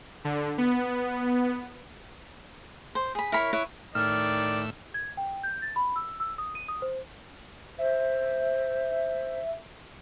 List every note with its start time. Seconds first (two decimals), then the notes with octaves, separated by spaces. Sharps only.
0.25 D3
0.58 B3
2.95 C5
3.15 G#4 B5
3.32 E4 A#4 C#5 B5
3.53 E4 B4 C#5
3.95 A2 D#3 D5 E6 F6
4.94 G#6
5.17 G5
5.43 G6
5.62 A6
5.76 B5
5.96 E6
6.20 E6
6.38 D#6
6.55 D#7
6.69 D#6
6.82 C5
7.79 C5 E5